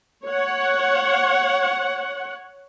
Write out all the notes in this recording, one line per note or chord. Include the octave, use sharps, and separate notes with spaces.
C#5 F#5